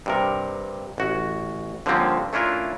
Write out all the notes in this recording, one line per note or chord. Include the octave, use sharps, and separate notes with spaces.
G2 C3 A#4
A1 F#4
D3 F3 G3 A#3 C4 C#4
A3 C#4 D4 E4 F4 A#4